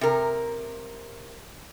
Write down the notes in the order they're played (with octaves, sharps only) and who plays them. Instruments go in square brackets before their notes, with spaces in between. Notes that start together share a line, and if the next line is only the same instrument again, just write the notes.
[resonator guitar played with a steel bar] C3 A#4